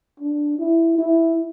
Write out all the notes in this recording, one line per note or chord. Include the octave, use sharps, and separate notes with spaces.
D4
E4
E4